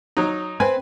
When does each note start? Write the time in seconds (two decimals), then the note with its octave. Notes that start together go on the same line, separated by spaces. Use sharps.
0.17 F#3 D#4
0.60 C4 B4 G#5